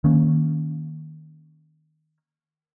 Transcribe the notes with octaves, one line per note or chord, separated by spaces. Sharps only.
D#3 A#3 C#4